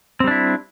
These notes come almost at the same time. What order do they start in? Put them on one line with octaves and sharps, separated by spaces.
C4 G3 D4 E4